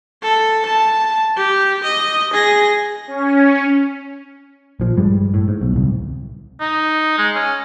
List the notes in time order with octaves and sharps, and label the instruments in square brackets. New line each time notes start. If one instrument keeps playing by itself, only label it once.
[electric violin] A4
A5
G4
D#5
G#4 A#6
[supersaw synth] C#4
[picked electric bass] A#1 F3
G2 G3 G#3
A2
G#2
B1
D1 C2
[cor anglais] D#4
G#3
C#4